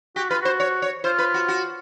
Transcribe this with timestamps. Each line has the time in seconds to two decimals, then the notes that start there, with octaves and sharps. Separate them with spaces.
0.16 F#4 G4
0.29 F4 B4
0.41 F#4 C5
0.60 C#5
0.82 C#5
1.04 F4 C5
1.19 B4
1.34 F#4
1.48 F#4